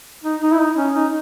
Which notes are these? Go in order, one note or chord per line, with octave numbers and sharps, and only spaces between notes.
D#4
D#4
E4
D#4
C#4
D#4